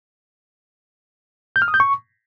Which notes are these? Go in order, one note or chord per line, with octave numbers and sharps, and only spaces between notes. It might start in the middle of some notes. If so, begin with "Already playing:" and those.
G6
F6
D#6
G6
C#6